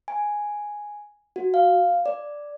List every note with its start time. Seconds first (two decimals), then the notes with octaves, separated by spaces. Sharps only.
0.08 G#5
1.36 F#4
1.54 F5
2.06 D5